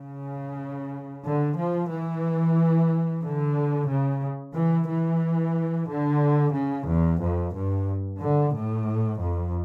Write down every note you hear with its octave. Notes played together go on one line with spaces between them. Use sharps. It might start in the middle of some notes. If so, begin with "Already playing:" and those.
Already playing: C#3
D3
F3
E3
D3
C#3
E3
E3
D3
C#3
E2
F2
G2
D3
A2
F2